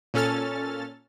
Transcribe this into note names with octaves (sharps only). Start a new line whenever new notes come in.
A#2 C#4 A4 F6 A6